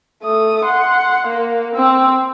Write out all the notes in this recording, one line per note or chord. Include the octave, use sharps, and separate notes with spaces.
A3 D#6
F#5 C6
A#3
C4 E6